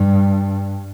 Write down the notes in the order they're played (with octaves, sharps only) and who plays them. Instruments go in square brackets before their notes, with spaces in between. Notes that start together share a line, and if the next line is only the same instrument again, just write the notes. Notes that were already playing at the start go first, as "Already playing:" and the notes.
Already playing: [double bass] G2